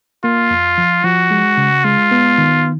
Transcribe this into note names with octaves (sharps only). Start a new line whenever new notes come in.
A#3 F4
F2
F3
F3 F#4
G#3
C#3
G#3 F4
B3
D#3